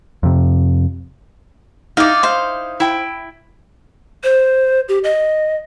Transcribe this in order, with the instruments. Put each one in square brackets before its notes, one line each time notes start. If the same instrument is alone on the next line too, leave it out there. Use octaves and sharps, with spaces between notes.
[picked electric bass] F2 C3
[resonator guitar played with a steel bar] D#4 E4 [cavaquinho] D5 F5
[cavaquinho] C5 F5
[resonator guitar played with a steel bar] E4 G5
[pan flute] C5
G4
D#5